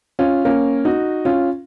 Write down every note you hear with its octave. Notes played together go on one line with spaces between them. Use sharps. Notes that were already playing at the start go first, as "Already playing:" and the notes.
C#4 F4
A#3 C#4
D#4 F#4
C#4 F4